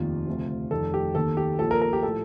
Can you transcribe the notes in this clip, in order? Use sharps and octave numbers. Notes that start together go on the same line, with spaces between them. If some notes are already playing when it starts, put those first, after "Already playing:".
Already playing: F1 D#2 D#3 F4
D2 C3 F3
F1 F2 D#3 A4
G4
D#2 D#3 A4
G4
A#1 A#2 F3 A4
A#4
A#4
G4
A2 F3 A4